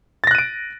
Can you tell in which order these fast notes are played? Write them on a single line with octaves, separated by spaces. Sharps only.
A6 A#6 F#6 D#7 D7